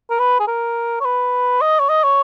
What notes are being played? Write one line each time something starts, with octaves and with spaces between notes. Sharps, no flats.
A#4
B4
G#4
A#4
C#5
B4
D#5
C#5
D#5
C#5